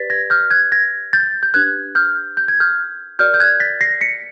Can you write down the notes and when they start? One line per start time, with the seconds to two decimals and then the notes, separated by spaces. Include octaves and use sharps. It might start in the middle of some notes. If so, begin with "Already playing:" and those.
Already playing: G4 B4 D5 A6 B6
0.10 G#6 A#6
0.30 F6 G6
0.51 F#6 G#6
0.72 G#6 A#6
1.13 G6 A6
1.43 G6
1.54 D4 G4 B4 F#6 G#6
1.95 F6 G6
2.37 G6
2.48 G#6
2.60 F6 G6
3.19 F#4 A#4 D5 F6 G6
3.34 G6
3.40 F#6 G#6
3.60 A6 B6
3.81 A#6 C7
4.01 B6 C#7